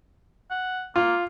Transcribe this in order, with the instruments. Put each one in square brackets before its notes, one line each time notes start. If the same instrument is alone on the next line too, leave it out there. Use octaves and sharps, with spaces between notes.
[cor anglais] F#5
[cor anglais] A#3 [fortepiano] F4